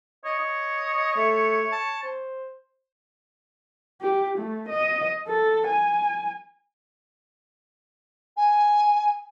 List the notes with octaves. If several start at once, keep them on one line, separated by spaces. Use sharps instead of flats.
C#5 D#5
D#5
A3
A5
C5
G4
A3
D#5
A4
G#5
G#5